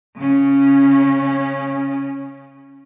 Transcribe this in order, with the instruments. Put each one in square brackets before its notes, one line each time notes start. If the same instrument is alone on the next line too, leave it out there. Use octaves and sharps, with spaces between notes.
[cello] C#3 C#4